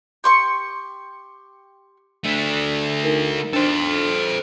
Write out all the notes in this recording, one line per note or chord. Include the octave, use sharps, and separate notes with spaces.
G4 C6 C#6
A3 D4
D#4 A#4
D4 A4 C5